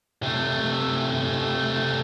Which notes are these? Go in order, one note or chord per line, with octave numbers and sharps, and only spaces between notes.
C3 A3